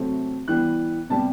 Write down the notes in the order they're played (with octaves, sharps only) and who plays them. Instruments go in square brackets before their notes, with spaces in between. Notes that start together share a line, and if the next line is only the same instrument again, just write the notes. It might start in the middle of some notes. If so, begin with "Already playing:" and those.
Already playing: [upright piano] C3 F#3 A3 C4
E3 G3 B3 F#6
C3 G3 B3 A5